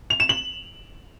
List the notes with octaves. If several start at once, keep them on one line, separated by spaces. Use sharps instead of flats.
F7
E7
F#7